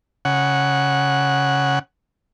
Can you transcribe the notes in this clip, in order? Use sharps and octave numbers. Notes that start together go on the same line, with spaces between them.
C#3 F#5